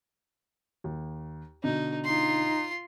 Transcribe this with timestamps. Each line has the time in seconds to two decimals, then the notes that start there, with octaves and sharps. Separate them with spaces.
0.84 D#2
1.64 B2 D3 D#4
2.05 D#4 F4 C6